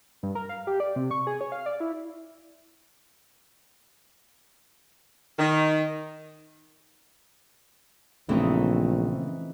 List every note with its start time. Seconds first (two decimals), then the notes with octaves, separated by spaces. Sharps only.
0.23 G2
0.35 A#4
0.49 F5
0.67 G4
0.80 D5
0.96 C3
1.11 C#6
1.27 G#4
1.41 C#5
1.52 F5
1.66 D5
1.80 E4
5.39 D#3
8.29 A#1 C#3 E3 A3 C4 D#4